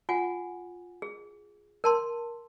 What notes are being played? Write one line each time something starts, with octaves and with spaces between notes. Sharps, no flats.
F4 F#5 G#5
G#4
A#4 A5 C6